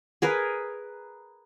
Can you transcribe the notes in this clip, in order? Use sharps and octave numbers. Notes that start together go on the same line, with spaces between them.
G#4 A#4 B4